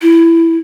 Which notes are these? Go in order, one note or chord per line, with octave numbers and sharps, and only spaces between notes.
E4